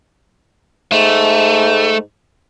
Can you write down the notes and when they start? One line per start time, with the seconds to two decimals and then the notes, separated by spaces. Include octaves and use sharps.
0.92 G#2 A3